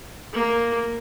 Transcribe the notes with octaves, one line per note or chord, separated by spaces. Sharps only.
A#3